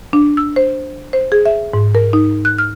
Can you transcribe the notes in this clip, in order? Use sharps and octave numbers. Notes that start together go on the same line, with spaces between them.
D4
E6
C5
C5
G#4
E5
G#2
A#4
D#4
F#6
F6